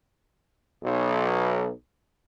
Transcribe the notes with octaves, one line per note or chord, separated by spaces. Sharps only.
B1